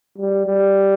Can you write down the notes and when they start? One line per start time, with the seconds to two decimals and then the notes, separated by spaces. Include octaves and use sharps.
0.18 G3
0.46 G3